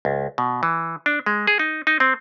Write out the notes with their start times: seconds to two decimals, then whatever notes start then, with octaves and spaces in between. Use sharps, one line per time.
0.05 C#2
0.38 B2
0.63 E3
1.06 D4
1.26 G#3
1.47 G#4
1.59 D#4
1.87 D#4
2.00 C4